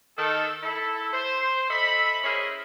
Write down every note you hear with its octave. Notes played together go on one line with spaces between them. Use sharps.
D#3 A4
E4 A4
C5
A4 D#5 E5 B5
C#4 E4 G#4 A#4 C5 D#5